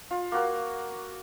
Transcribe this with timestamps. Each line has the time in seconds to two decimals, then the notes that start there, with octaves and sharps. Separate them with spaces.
0.11 F4
0.32 A#3 F#4 A#4